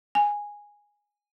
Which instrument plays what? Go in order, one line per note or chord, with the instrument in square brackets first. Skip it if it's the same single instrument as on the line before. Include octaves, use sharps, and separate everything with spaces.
[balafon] G#5